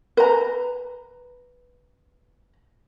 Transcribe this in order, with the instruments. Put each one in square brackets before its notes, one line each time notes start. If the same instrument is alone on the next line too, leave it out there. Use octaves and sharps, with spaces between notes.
[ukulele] B4 A#5